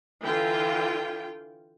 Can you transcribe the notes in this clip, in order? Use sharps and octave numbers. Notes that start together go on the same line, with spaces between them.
D3 E3 F4 G5